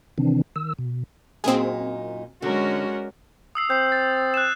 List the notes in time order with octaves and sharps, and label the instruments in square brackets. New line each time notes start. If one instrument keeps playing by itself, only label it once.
[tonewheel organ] C3 D#3 E3 C4 D4
D#3 E6
B2
[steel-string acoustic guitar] F#2 A#2 D#4 [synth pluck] C4 G#4
[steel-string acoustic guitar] D3 [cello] G#3 F#4 [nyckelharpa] C#4 A#4
[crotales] D#6 E6 C7
[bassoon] C4 [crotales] G6 C7
[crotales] A6
F#6 E7